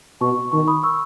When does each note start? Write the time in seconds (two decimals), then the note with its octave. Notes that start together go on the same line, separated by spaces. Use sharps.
0.21 B2 A5 C#6
0.52 D#3 A5 C#6
0.67 B5 D#6
0.83 C#6 E6